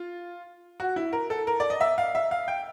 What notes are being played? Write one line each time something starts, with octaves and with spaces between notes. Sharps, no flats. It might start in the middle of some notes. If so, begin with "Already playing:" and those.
Already playing: F4
F#4
E4
A#4
A4
A#4
D5
D#5
E5
F5
E5
F5
G5